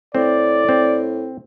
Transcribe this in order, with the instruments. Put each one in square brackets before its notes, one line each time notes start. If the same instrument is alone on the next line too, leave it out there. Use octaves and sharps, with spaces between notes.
[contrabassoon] A2 [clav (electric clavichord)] C4 [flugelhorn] D5
[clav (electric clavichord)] C4